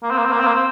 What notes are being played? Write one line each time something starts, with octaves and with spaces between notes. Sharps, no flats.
A#3
C4
A#3
C4
A#3
C4
A#3
C4